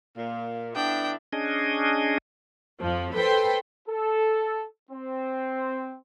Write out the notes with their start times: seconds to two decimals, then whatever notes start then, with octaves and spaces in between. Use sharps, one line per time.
0.18 A#2 F5
0.75 D3 B3 D4 E4 G5
1.33 C#4 D4 G#4 D#5
2.81 F2 F3
3.15 A4 B4 C5 G5 C6
3.88 A4
4.91 C4